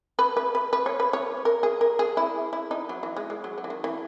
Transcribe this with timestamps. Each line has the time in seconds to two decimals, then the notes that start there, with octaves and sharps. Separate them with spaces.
0.19 B4
0.37 B4
0.55 B4
0.73 B4
0.86 C#5
1.00 B4
1.13 C#5
1.45 A#4
1.63 G#4
1.81 A#4
1.99 G#4
2.17 E4
2.53 E4
2.71 D#4
2.89 F#3
3.03 E3
3.16 G#3
3.30 G#3
3.44 F#3
3.58 F#3
3.64 E3
3.70 D#3
3.84 E3